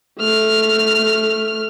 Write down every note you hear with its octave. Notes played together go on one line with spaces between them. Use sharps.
A3 F6